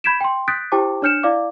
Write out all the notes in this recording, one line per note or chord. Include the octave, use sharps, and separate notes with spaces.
B5 G6 G#6 B6 D7 E7
G5 C6
D#6 F#6 G6 A6 B6 D7
E4 G4 C5 G5 A5 D6
D4 C#5 F6 G6 C#7 E7
E4 D5 F5 D6